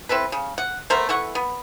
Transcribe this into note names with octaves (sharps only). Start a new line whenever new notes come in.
C4 E4 A4 B4
C#3
F#5
A3 B3 A#4 C5
E3 A4 F#5 C#6
B3